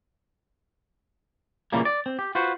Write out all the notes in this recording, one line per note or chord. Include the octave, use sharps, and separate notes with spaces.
A#2 C#3 E3 G3 A#3
D5
C4
G4
F4 F#4 B4 C5